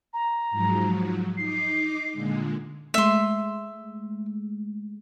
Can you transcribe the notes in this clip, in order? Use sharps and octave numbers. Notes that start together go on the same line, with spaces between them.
A#5
G#2 F3 F#3
D#4 D6 C7
A#2 D3 G#3
G#3 A3 E5 C6